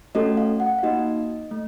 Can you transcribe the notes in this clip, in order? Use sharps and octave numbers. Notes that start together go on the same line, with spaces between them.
A3 C#4 F#4 A4 D#5
F5
F#5
F5
A#3 D#4 F#4 D#5
A3